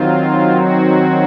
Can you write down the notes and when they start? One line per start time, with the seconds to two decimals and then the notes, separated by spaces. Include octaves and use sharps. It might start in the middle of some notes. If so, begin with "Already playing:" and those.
Already playing: D#3 F#3 C4 F4
0.52 F#4